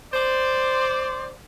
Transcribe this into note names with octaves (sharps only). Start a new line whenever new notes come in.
C5 D5